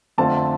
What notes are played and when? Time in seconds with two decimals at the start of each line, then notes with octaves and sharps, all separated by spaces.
0.18 F2 D3 A3 C4 F4 A5